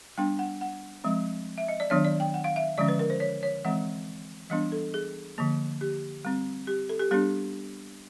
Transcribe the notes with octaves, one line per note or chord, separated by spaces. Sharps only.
G3 B3 D4 G5
F#5
F#5
F3 G#3 C4
E5
D#5
D5
D#3 F#3 B3 D4 C#5
D5
G5
F#5
F5
E5
D3 F3 G#3 C#4 D5
B4
A#4
C5
C#5
C#5
E3 G#3 C4 F#5
E3 G3 B3 D4 D#5
A4
G#4
D3 F3 A#3
G4
G3 C4
G4
A4
G4
G3 B3 D4 G4